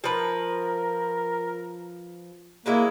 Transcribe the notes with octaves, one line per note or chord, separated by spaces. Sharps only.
F3 A#4 B4
F#3 G#3 A#3 E4